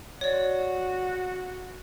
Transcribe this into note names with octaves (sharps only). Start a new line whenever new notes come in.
F#4 C#5 D5